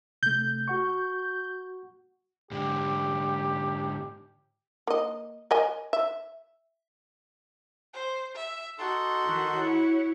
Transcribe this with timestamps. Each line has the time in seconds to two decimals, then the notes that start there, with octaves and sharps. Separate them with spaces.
0.23 C3 A3 G6
0.68 F#4 F#5 C#6
2.51 G#2 D3 G4
4.87 A#3 D#5
5.51 A#4 D#5 G#5
5.93 E5
7.94 C5
8.35 E5
8.79 D#4 F#4 A4 C6
9.25 D#3
9.57 E4 C#5